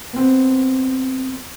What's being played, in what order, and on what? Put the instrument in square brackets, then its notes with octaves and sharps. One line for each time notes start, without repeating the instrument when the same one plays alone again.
[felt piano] B3 C4